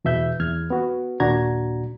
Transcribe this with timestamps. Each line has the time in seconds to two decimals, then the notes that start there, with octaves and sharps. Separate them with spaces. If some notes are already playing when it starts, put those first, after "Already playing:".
0.05 E2 B2 E5 G6
0.40 E2 F6 G#6
0.70 B3 F#4
1.20 D#2 A#2 D4 F#4 A#5 G#6